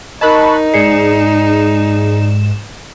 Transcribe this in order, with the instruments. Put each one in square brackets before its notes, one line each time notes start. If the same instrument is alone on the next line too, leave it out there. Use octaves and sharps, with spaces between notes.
[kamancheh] D#4 [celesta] A#4 D#5 [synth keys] A5 B5 F#6 [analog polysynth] C#6
[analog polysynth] G#2 E7 [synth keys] G#4 [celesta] D5 C7 C#7